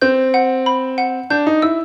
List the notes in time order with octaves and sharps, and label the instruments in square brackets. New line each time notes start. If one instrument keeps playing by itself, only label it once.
[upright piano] C4 [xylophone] G6
[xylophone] F#5
B5
F#5
[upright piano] D4 [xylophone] G6
[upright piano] D#4
[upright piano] E4 [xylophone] E6